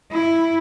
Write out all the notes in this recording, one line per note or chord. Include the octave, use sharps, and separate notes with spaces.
E4